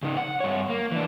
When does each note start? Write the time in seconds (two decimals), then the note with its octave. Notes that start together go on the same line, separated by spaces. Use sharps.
0.03 C#3 D#4
0.17 F#5
0.40 G2 C#5
0.70 A#3
0.92 E3 D4